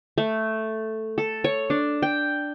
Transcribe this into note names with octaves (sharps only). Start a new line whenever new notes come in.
A3
A4
C#5
D4
G5